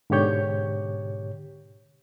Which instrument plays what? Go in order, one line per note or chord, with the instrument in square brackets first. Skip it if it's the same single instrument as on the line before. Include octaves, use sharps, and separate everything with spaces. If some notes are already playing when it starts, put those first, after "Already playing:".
[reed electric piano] G#2 B2 D3 G4 C#5 G6